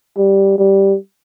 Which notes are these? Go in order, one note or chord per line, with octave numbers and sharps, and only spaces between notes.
G3
G3